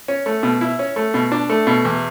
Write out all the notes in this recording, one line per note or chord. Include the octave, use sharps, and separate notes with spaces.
C#4
A3
B2
E4
C#4
A3
B2
D4
A3
B2
E2